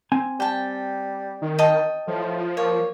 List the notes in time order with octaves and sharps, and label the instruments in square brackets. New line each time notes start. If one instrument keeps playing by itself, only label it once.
[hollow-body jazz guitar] C4 G#5
[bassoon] G3 [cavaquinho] G5 A5
[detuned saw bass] D#3
[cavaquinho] D#5 G5 A5
[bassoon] A2 [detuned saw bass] F3
[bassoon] A#3 [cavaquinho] C#5